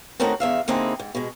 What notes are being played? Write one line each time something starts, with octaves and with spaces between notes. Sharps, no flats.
A3 C4 C#4 D#4 F#4 A#4
E2 E5 F5
D3 A#3 C4 D#4 E4 G#4
G#2
B2 G#3